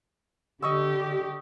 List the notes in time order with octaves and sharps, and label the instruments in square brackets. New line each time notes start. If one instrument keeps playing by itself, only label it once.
[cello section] D3 G4 [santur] D#5 C#6 E6